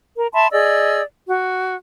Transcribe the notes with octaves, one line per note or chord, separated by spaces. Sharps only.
A#4
E5 A5 B5 C6
G#4 D5 D#5 E6
F#4